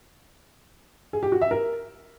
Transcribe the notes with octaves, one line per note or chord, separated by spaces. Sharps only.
G#4
G4
F#4
E5
A#4